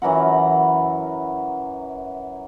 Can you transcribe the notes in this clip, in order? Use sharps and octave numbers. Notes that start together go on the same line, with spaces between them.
F#2 E3 A#4 F#5